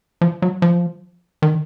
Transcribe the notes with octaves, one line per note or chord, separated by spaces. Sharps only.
F3
F#3
F3
D#3